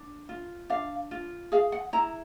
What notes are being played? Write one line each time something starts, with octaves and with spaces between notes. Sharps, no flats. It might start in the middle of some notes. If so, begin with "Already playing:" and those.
Already playing: D4
F4
D4 F5
F4
G#4 F5
F#5
E4 A#5